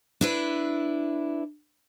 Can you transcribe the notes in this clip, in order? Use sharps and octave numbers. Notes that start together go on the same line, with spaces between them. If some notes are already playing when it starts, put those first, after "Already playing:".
D4 E4 B4